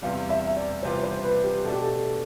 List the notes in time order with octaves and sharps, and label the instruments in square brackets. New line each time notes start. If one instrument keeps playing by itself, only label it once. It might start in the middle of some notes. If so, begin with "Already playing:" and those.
[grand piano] E2 C3 E3 G3 [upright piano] F5
[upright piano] E5
E5
D5
[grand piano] C2 C3 E3 B3 F4 [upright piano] C5
[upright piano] C5
B4
G4
[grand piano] B2 A3 D4 [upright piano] A4
[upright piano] G4
A4